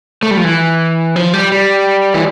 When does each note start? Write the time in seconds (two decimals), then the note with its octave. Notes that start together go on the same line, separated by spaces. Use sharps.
0.23 A3
0.31 G3
0.37 F3
0.44 E3
1.16 F3
1.34 G3
1.52 G3
2.14 E3